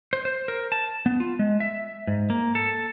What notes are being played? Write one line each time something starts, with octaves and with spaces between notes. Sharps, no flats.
C5
C5
A#4
A5
B3
F4
G#3
E5
G#2
A#3
A4